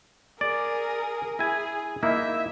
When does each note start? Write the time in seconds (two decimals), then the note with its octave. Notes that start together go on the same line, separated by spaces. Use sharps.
0.41 G#4 A#4 D5
1.39 E4 G#4 G#5
2.03 A#3 D#4 E4 E5